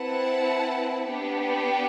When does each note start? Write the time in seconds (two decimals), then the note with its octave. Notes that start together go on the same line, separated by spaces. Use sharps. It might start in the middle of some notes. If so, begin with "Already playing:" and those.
Already playing: C4 E4 B4 F#5 A5
1.07 B3 D4 G4